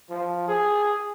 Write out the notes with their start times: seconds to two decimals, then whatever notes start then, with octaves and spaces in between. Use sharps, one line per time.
0.10 F3
0.48 G#4